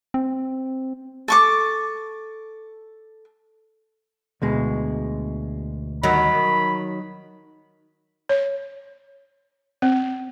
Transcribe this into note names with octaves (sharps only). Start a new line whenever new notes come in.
C4
A4 C#6 D6
D2 B2 G#3
D#3 F#3 B5
C#5
C4